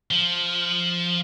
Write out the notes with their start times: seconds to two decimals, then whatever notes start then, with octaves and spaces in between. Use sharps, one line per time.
0.11 F3